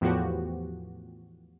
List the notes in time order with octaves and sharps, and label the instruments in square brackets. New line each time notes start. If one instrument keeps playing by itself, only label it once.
[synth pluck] E2 A2 F3 B3 F#4 G4